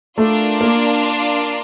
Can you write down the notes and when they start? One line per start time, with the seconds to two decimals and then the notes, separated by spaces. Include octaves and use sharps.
0.18 A3 D4 F4 A#4 D5 F5
0.61 A#3